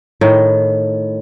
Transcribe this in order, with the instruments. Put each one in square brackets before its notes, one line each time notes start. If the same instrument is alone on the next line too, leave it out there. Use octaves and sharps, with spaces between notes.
[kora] A2 D#3